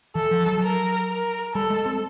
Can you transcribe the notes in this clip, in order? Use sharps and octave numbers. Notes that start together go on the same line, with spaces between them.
E3 A4
F3
F#3
A#4
A#4
G3 A4
G#3
C4